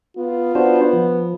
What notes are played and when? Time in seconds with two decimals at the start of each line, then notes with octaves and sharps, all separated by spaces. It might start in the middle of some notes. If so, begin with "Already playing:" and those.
0.17 B3 F4
0.55 B3 D4 F#4 C5
0.93 F3